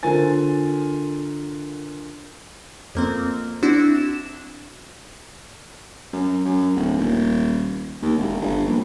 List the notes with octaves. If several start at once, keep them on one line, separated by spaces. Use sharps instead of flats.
D3 F4 A#4 C5 G#5 A6
F2 A#3 C4
C4 D4 E4 F#4
E7
F#2
F#2
D1
D#1
D#2
E1
G1
A#1